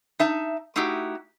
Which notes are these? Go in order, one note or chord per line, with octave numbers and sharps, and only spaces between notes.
D#4 E5 A5
A3 D#4 E4 F#4 G4